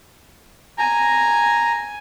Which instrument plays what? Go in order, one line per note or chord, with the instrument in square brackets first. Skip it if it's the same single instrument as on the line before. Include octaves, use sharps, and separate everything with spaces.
[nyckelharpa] G#5 [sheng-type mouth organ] A#5